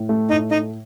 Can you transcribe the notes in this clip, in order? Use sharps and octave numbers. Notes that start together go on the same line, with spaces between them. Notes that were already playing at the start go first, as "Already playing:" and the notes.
Already playing: A2
A3
A2 D#4 D#5
A3 D#4 D#5